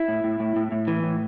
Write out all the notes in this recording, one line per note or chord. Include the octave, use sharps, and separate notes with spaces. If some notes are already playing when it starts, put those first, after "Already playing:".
Already playing: E4
A2
A2
A2
A2
A2
E3
A2